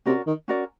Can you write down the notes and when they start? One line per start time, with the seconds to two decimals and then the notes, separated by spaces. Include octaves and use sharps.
0.06 C3 C#4 F#4 A#4 D5
0.27 D#3
0.48 C#4 F#4 A#4 D5